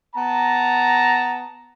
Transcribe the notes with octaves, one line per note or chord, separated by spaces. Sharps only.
B3 A5 A#5